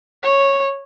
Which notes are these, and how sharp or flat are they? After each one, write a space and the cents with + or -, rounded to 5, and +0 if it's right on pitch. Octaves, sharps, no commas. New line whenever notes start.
C#5 -5